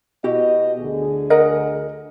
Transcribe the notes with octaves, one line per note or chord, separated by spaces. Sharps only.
B2 E4 F#4 G4 D#5
D2 D3 G#4
A#4 D#5 F#5